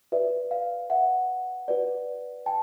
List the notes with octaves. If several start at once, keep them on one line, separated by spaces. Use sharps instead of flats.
F#4 B4 D5 E5
F5
E5 F#5
F#4 B4 D5
G5 A5